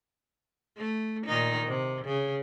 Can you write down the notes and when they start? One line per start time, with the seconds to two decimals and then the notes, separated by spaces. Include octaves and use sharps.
0.77 A3
1.26 A#2 D#3 D#4
1.67 C3
2.05 C#3